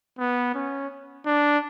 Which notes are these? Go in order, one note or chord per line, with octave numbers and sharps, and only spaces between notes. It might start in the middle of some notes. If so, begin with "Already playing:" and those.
B3
C#4
D4